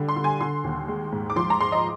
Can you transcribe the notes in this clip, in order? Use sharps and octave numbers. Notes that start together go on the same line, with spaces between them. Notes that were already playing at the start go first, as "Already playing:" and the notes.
Already playing: D3 G3
C6
D3
G#5
D3 C6
D#2
G#3
G#2
D6
F3 C6
A#5
G#3 C6
D#5